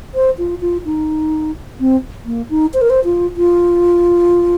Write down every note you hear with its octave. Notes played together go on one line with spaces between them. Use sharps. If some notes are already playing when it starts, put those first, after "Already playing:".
C5
F4
F4
D#4
C4
A#3
D#4
C5
A#4
C5
F4
F4